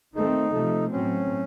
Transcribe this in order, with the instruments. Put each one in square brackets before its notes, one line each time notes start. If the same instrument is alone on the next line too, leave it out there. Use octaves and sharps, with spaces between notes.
[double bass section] D#3 A3 C4 [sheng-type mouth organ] D#4
[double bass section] C3 F3 A3
[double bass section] A2 F#3 C4 [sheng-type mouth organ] C#4